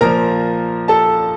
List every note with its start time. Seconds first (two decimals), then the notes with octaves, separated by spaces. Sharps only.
0.01 A#2 F3 A#4 A#5
0.88 A4 A5